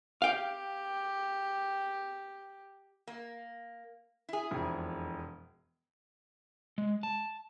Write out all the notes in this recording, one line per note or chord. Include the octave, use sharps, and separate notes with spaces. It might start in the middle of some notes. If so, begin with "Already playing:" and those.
G4 F5 G5
A#3
E4 G#4
E1 F2
G#3
A5